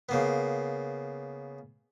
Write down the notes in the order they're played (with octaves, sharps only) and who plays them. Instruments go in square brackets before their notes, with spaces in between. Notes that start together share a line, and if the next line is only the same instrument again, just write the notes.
[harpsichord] C#3 A#3 B3